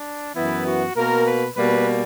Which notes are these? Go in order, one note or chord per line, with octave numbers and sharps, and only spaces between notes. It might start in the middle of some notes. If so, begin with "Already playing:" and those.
Already playing: D4
F#2 E3 B3 E4
F#4
B2 A#3 A#4
B4
B2 G3 A#3 B4